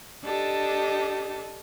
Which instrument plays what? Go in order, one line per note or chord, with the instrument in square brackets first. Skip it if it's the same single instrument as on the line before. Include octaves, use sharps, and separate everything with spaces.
[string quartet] D4 G4 A4 D#5